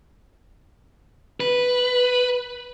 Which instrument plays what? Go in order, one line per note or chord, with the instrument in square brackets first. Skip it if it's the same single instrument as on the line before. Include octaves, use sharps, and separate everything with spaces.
[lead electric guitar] B4